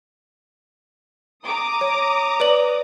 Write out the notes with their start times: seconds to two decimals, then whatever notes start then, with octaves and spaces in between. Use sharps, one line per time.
1.43 A#5 D6 D#6
1.81 C#5
2.40 B4 D5 F#7